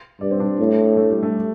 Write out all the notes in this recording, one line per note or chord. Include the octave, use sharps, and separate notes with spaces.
G2 D5
C4
D4
A2
A3
G3
A3